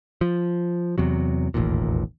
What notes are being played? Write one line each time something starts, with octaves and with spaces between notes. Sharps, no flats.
F3
E2 C3 F#3
E1 A1 D#2 A#2